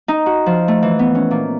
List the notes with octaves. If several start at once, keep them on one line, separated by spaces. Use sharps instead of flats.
D#4
F#4
F3
A3
E3
B3
C#4
A#2